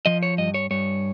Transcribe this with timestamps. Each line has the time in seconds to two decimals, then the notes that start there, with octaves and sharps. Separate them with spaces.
0.06 F3 D#5
0.23 C#5
0.38 G2 D#5
0.54 C#5
0.70 G2 C#5